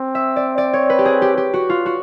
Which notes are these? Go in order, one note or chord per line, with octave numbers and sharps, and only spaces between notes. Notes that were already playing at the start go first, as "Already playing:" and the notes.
Already playing: C4
E5
D5
D5
C#5
B4
G4
G#4
G4
G4
F#4
F4
F#4